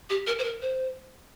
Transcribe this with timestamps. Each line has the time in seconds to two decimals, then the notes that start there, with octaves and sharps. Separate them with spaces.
0.10 G4
0.27 A#4
0.39 C5
0.44 A#4
0.62 C5